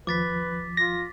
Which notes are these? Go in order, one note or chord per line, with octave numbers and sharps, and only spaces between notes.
D#2 F3 B4 D6 A6 B6
F4 A#6